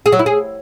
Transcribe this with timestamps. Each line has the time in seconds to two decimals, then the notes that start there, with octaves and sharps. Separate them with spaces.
0.06 G#4
0.12 F#3
0.19 E4
0.26 G#4